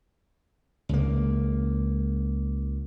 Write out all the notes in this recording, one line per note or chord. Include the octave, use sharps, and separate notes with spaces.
C#2 A#3